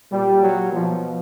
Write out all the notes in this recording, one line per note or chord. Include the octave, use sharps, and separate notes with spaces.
A#2 G3
F#3
B2 F3